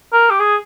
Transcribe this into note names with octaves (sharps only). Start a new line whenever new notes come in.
A#4
G4
G#4